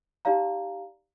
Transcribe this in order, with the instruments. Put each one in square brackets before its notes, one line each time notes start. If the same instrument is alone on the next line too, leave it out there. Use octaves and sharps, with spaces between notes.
[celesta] D#4 G4 D5 F5 A#5